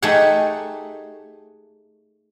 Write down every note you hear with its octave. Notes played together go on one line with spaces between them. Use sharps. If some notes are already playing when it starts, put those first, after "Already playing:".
A3 D#4 G4 G#4 F#5